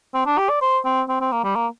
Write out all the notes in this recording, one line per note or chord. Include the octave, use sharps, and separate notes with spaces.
C4
D4
G4
D5
C5
C4
C4
C4
A#3
G3
A#3